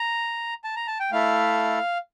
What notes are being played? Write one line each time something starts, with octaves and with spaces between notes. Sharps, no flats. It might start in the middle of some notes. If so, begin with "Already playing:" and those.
Already playing: A#5
A5
A#5
A5
G5
A3 E4 A4 F5